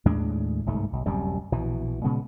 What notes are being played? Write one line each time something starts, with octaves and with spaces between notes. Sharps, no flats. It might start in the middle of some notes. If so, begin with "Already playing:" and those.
D#2 A2 G#3 D4
G1 C2 G#2 A3
B1
D1 F#2 C3 G3
A#1 B2 E3
A#2 C#3 G#3 B3